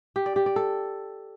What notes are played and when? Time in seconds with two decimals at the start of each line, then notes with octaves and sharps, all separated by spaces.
0.16 G4
0.26 D5
0.36 G4
0.46 D5
0.56 A4